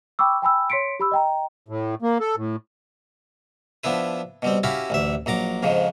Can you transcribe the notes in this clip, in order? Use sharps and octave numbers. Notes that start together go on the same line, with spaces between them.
G5 B5 C#6 D6 E6
G5 G#5 B5 E6
C#5 C6 B6 C#7 D7
G4 B5 E6
D#5 G5 A#5
A2
A#3
A4
A2
F3 B3 D4 E4 B4
B2 G3 C4
C#4 E4 F#4 G4 F5 B5
A1 D2 E5
A#1 F#3 A#5 D6
F2 G#2 C#3 F3